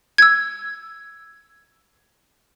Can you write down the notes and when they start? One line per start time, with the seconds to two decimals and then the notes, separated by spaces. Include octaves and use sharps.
0.18 E6 G#6